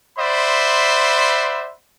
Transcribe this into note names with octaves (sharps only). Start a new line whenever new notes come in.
C5 D5 E5 F#5 B5 C6